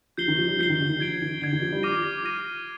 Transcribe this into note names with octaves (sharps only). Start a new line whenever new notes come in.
F3 G6 C7 G7
D#3
F3
G3
F3 G6 C7 G7
D#3
D3
D#3
F3 G#6 D7 G7
D#3
D3 G#6 D7 G7
D#3
F3
G3
F4 D6 F6 A#6 D#7
D6 F6 A#6 D#7